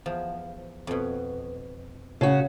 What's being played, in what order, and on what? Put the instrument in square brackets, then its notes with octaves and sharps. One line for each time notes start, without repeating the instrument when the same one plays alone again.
[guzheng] E2 F3
F2 B2
[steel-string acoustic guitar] C#3 F#4